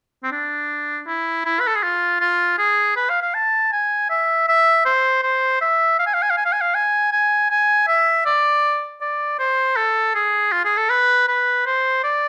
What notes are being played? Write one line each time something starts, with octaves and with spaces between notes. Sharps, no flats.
C4
D4
E4
E4
B4
A4
G#4
F4
F4
G#4
B4
F5
F5
A5
G#5
E5
E5
C5
C5
E5
F5
G#5
F5
G#5
F5
G#5
F5
G#5
F5
G#5
G#5
G#5
E5
D5
D5
C5
A4
G#4
F4
G#4
A4
B4
B4
C5
D5